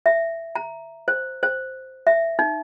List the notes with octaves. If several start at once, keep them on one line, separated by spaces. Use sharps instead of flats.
E5
A#5
C5
C5
E5
D#4